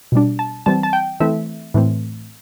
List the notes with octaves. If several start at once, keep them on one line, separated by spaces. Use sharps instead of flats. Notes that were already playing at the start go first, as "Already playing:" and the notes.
B2 G3 D4
A5
E3 G3 C4 A5
A5
G5
E3 A3 C4 E5
A2 E3 A3 C4